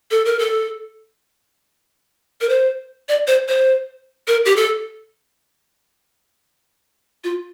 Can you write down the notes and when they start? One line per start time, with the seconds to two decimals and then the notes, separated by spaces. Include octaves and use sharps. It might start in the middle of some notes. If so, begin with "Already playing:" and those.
0.11 A4
0.25 A#4
0.39 A4
2.41 A#4
2.49 C5
3.09 D5
3.27 C5
3.48 C5
4.28 A#4
4.45 G4
4.56 A4
7.24 F4